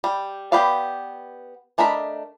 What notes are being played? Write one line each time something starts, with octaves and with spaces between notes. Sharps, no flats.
G3
B3 G4 B4 D5 F5
A3 D4 A#4 D#5 B5